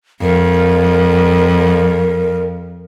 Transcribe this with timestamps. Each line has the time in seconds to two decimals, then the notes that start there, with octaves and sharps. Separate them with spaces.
0.22 F2 A#4